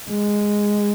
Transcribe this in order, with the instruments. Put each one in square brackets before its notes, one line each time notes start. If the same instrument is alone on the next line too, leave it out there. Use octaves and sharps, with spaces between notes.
[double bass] G#3